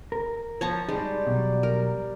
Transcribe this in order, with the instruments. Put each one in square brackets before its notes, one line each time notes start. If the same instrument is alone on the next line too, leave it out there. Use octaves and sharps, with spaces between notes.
[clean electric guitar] A#4
[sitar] F3 [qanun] C#5 A5 A#5
[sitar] G3 [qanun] G#3 [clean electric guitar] D#4
[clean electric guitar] B2 F#3
[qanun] A#4